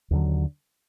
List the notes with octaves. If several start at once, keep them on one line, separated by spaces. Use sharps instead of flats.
D#2 D3 F#3